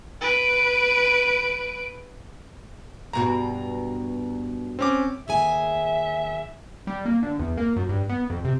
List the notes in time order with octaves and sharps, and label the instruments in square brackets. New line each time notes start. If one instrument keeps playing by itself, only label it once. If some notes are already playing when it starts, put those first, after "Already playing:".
[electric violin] B4 D7
[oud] G2 B2 F#4 [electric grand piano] A#5
[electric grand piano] C4 C#4 D6
[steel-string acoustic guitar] D#2 G#4 G#5 [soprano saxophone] E5
[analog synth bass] G3
A#3
D3
E2
A#3
F#2
G2
B3
F2
C3